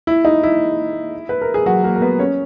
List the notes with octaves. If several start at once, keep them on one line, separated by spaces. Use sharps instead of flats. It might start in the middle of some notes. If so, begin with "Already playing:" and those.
E4
D#4
E4
B4
A#4
G#4
F#3 F#4
A#3 A#4
A#4
B3 B4
C#4 C#5